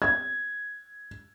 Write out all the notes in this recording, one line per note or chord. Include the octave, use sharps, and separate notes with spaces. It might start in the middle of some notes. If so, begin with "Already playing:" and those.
G#6